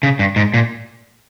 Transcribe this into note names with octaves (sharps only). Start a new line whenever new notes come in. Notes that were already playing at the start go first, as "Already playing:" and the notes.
C#3
G2
G#2
A#2